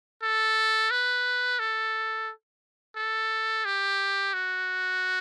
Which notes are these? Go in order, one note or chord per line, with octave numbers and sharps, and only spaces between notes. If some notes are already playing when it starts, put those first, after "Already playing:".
A4
B4
A4
A4
G4
F#4